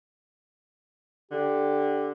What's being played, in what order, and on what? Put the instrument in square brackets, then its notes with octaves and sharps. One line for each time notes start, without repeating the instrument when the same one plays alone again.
[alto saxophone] D3 [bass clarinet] G4